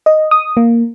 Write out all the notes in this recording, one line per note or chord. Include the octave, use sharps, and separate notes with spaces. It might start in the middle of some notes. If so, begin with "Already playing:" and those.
D#5
D#6
A#3